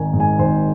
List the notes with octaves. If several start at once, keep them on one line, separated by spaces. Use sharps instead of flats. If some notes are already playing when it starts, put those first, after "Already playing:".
Already playing: G#1 D#3 G#5
G#2
G#5
G#1 C5